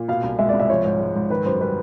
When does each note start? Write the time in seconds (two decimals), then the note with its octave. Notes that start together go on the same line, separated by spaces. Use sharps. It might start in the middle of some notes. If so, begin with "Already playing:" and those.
Already playing: A#2
0.08 B2 F5
0.24 C2
0.39 G#3 E5
0.49 D5
0.54 C2
0.60 E5
0.69 F3 C#5
0.85 G#2
1.00 G#3
1.15 G#2
1.30 D#3 B4
1.46 F#2 C5
1.61 G3 B4